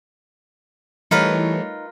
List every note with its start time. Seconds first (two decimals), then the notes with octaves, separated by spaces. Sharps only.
1.11 E3 G3 A3 D#4 F4 A#4 B4 C#5